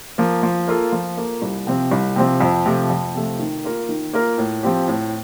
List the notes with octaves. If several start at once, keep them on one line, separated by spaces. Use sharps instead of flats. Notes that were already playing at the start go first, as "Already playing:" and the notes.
F3 A#3
F3
A#3 F4 A4
F3
A#3 F4 A4
C2
C3 F3 C4
C2
C3 F3 C4
F2
C3 F3 A3
F2
C3 F3 A3
D#3
A#3 F4 A#4
D#3
A#3 F4 A#4
A2
F3 C4 G4
A2